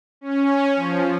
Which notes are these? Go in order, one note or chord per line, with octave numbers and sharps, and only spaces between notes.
C#4
F3